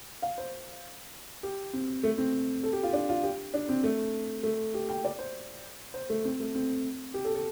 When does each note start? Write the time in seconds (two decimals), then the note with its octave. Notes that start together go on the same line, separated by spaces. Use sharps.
0.22 F5
0.38 C5
1.43 G4
1.73 C4
2.03 A3
2.18 C4
2.63 A4
2.73 G4
2.83 F4
2.93 D4
3.09 F4
3.23 G4
3.54 D4
3.69 C4
3.84 A3
4.43 A3
4.74 G4
4.89 G5
5.05 D5
5.19 C5
5.94 C5
6.10 A3
6.25 C4
6.40 A3
6.55 C4
7.14 G4
7.25 A4
7.35 A4